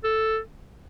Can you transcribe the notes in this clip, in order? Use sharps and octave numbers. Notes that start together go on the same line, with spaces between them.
A4